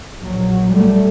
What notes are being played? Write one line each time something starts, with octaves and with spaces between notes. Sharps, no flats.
A#1 F#3
G3 A3